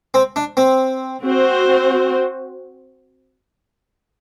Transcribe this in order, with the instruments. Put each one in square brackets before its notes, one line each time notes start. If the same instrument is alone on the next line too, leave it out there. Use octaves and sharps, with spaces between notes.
[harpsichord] C4
D4
C4
[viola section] C4 F#4 C5